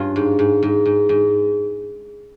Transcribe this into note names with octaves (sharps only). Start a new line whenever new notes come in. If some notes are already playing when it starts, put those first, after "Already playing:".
Already playing: G2 C#4 F4
G#2
G#2
G#2
G#2
G#2